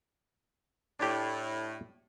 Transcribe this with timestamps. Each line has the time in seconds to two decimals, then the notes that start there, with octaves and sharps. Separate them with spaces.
1.00 A2 D4 G4